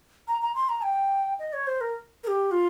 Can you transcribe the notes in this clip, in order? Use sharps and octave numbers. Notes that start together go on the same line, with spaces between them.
A#5
A#5
C6
A#5
G5
D#5
C#5
C5
A#4
A#4
G4
F4